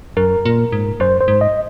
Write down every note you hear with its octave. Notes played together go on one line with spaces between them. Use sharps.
F#2 A#4
A#2
G#2
F#2 C5
C5
G#2
D#5